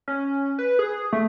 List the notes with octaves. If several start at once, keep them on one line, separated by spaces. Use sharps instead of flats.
C#4
B4
G#4
A3